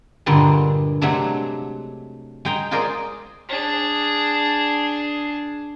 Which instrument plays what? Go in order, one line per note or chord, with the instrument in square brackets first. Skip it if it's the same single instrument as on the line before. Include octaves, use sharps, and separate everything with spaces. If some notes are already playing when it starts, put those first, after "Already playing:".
[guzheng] G2 A#2 D3 G3 G#3
C3 F#3 G#3 A3 D4 A4
G#3 G5 A#5
F4 G#4 A#4 C5 D5 D#5
[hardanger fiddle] D4 G#4